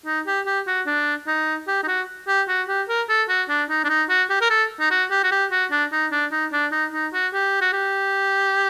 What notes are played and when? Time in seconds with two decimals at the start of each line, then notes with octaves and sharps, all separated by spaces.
0.06 D#4
0.27 G4
0.46 G4
0.67 F#4
0.86 D4
1.27 D#4
1.68 G4
1.83 D#4
1.88 F#4
2.28 G4
2.48 F#4
2.68 G4
2.89 A#4
3.09 A4
3.29 F#4
3.49 D4
3.69 D#4
3.84 D4
3.89 D#4
4.09 F#4
4.30 G4
4.41 A#4
4.50 A4
4.80 D#4
4.91 F#4
5.11 G4
5.24 F#4
5.32 G4
5.51 F#4
5.71 D4
5.92 D#4
6.12 D4
6.32 D#4
6.52 D4
6.72 D#4
6.93 D#4
7.13 F#4
7.33 G4
7.61 F#4
7.73 G4